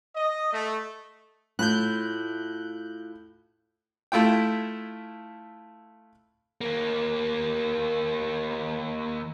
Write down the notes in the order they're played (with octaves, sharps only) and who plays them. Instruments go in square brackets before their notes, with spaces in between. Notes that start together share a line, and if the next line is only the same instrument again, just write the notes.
[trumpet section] D#5
A3
[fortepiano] A2 [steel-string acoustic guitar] E4 F4 [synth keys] F#6 G6
[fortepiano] A3 E4 F4 G5
[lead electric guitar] D#2 A#3